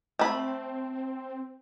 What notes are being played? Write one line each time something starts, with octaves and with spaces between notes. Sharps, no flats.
A3 C4 B5